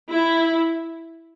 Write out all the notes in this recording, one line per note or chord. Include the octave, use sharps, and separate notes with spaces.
E4